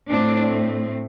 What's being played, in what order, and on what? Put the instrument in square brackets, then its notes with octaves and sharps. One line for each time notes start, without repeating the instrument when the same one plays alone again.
[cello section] A2 A3 C4 D4